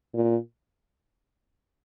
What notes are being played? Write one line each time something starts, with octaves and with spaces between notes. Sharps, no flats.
A#2